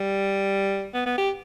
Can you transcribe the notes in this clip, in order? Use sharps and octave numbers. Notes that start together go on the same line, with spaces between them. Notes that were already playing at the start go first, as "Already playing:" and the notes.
Already playing: G3
B3
B3
G4